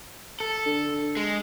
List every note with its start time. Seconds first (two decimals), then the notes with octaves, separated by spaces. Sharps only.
0.40 A4
0.66 D3
1.17 G#3